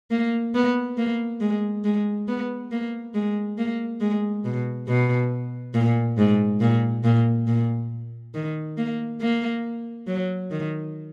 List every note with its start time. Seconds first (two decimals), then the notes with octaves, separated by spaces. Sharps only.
0.11 A#3
0.55 B3
0.97 A#3
1.41 G#3
1.84 G#3
2.28 B3
2.71 A#3
3.14 G#3
3.58 A#3
4.01 G#3
4.45 B2
4.88 B2
5.74 A#2
6.18 G#2
6.61 A#2
7.04 A#2
7.47 A#2
8.34 D#3
8.77 A#3
9.21 A#3
10.07 F#3
10.51 D#3